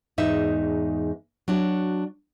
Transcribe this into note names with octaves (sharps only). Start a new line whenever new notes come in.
E2 G#2 D#4 E5
F#3 D4 F#4